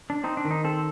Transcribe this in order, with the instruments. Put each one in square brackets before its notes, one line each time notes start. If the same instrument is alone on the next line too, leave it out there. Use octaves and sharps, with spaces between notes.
[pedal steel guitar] D4
C4 D#4
D4
D#3
D#4
C4 A4